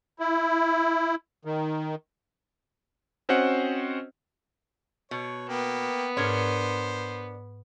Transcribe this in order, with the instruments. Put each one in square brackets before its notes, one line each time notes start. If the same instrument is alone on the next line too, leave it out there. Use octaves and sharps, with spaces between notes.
[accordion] E4
D#3
[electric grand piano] C4 C#4 F#4 C5 D#5 F#5
[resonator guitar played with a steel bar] B2 [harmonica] C#5
[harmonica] A#3 G5 [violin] B3
[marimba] G#2 G#6 [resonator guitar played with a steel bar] D4 A#4 C#5 [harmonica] C5